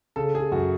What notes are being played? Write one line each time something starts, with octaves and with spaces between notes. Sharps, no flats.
C#3 A4
G#4
F#2 F#4